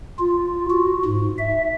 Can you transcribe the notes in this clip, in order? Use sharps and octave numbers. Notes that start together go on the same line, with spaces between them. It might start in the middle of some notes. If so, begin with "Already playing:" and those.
F4
F#4
G#2
E5